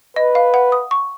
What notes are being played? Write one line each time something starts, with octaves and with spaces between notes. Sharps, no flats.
B4 D#5
F5
F#5
D#6
C#6